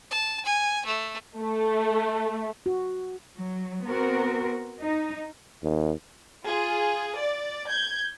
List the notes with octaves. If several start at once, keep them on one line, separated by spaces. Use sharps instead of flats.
A5
G#5
A3
A3
F#4
F#3
B3 C4 F#4 A#4
D#4
D#2
F4 G#4
D5
G6 G#6